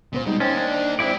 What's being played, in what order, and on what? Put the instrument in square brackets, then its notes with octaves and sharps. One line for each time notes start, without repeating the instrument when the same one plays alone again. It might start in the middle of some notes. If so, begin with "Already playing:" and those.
[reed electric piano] C#2 B3 C5 [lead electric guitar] A#2
[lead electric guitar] B2 [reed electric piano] G3 G#3 D#4
[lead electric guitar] A#3 D#4 [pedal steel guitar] C#4 [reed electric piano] C5 G5 A6
[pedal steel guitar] D4
[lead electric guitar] G#2 G4 [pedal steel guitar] C4 E4 D5